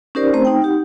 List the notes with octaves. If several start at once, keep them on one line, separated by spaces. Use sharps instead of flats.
C#4 D#4 G4 A#4 C5 D5
A3 C4 C5 A#5
D#4 G5
D#4 G4 F#5